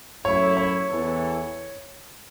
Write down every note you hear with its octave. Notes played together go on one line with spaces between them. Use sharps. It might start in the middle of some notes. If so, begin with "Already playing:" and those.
F#2 F#3 A3 E4 C#5
C#5
E2 E3 B3 A4